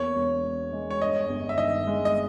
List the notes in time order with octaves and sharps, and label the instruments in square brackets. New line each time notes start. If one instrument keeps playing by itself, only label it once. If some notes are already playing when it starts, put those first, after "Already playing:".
Already playing: [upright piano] E2 A#3 [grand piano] C#5
[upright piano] E1
B2
G#3
[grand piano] C#5
[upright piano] G2 [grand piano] D#5
[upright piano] G1
[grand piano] E5
[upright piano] D#3 [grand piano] D#5
[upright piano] G#3
[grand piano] D#5